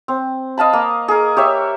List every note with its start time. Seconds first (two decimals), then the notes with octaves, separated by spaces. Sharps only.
0.08 C4
0.58 D#5 F5 A5 B5
0.73 A#3
1.08 G#4 A#4
1.37 G4 C#5 E5